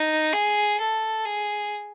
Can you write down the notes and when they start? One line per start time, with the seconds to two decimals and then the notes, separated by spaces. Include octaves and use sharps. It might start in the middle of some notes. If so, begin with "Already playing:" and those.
Already playing: D#4
0.33 G#4
0.80 A4
1.25 G#4